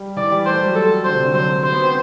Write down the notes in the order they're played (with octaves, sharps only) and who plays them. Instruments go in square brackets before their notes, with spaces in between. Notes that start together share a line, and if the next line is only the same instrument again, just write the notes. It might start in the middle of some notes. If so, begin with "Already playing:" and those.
Already playing: [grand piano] G3
[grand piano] E3 [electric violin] D5
[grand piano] G3
[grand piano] A3 [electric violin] C5
[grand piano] G3
F#3
[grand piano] G3 [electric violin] A4
[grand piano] D3 [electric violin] C5
[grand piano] C3
D3
[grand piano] F#3 [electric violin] C5
[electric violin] C5
[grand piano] B3
C4